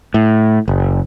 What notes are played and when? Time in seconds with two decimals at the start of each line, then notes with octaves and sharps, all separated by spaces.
0.14 A2
0.68 F#1